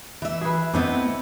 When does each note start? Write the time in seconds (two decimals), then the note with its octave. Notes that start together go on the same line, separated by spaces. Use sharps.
0.22 E3 E5
0.41 G#4 B4
0.73 A3 B3 C4 D4 E4 D#5